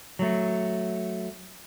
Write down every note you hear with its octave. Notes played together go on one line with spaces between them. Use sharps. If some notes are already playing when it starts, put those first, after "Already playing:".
F#3 A3